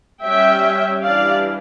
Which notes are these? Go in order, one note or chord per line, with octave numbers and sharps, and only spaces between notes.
G3 C#4 E5 G5
E3 G3 D4 D5 F5